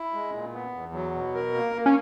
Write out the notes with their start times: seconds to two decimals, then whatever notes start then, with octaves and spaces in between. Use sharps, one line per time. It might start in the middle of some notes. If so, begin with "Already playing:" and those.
Already playing: E4
0.13 G#3
0.33 A#2
0.53 B3
0.74 E2
0.94 F#3
1.14 B2
1.34 A#4
1.55 A#3
1.75 A#3
1.86 C#4